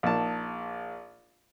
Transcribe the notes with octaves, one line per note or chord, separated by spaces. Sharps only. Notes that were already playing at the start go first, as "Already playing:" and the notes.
A#1 D#4 A5